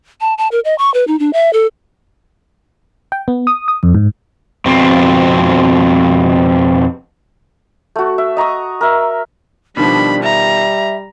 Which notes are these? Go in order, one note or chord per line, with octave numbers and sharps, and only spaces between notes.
A5
A5
A#4
D#5
C#6
B4
D#4
D4
E5
A4
G5
B3
D#6
D#6
F2
G#2
F2 B2 C4
A3 F#4
E5
D#5 A#5 C#6 D#6
A#4 E5
B2 D#3 F3 G3 D4 B5
E5 A#5